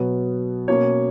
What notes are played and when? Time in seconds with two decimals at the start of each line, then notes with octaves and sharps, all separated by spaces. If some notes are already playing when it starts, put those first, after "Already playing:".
Already playing: B2 F#3 B3
0.68 B2 A#3 C#4 C#5